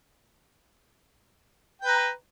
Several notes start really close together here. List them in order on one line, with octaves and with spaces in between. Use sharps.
G5 B4 A#5